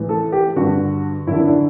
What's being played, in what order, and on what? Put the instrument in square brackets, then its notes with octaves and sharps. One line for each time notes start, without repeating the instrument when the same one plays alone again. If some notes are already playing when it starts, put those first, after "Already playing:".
Already playing: [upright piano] A2 E3
A4
G4
G2 D3 F#4
F#2 E4
D3
E4
D4